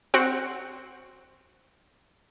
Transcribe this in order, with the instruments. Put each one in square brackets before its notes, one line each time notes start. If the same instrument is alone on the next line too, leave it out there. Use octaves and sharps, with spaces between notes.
[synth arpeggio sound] C4 F#4 F#5 C#7